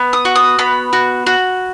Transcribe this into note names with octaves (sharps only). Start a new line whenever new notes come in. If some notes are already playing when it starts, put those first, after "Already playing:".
Already playing: B3
D#6
F#4
D#6
B3 B5
F#4
F#4